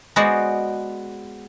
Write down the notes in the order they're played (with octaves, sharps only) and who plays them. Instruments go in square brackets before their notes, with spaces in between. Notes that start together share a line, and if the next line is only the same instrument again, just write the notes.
[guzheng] G#3 B3 F#4 C5 D5